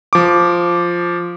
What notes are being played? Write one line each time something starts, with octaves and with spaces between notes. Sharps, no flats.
F3 D6